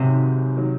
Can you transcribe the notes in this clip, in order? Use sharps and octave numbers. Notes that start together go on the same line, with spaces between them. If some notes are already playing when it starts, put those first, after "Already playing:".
Already playing: G#1 G#2 C3 D#3 F#3
D#3 F#3